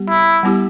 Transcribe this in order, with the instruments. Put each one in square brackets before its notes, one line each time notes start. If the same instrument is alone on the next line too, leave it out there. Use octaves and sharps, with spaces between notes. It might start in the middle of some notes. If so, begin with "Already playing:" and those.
Already playing: [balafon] G3 B3 G4
[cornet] E4
[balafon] G3 B3 E4 G4